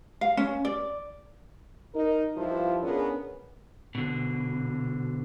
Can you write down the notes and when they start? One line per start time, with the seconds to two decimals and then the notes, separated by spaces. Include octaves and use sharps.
0.21 F5
0.37 C#4
0.65 D5
1.94 D#4 A#4
2.36 G2 F3 E4 F4
2.82 B3 C#4 D4 G#4 A#4 C#5
3.95 B2 D3